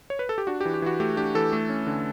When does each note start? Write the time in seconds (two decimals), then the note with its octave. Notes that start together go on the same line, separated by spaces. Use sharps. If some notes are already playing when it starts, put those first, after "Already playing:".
0.10 C#5
0.19 B4
0.29 A4
0.38 G4
0.47 D4 F#4
0.61 G4
0.65 E3
0.74 G4
0.82 E3 F#4
1.00 A3 G4
1.17 D4 G4
1.35 E3 A4
1.53 A3
1.69 C#4
1.87 D3